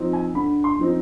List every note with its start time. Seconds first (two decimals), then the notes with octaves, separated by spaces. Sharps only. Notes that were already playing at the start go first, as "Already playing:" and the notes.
Already playing: F3 C4 D#4
0.13 G#5
0.35 D3 B5
0.64 C6
0.79 F3 C4 D#4